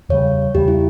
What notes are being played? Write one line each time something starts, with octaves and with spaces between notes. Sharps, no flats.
E2 C#3 G3 C#5
E2 C#3 G3 G4
E4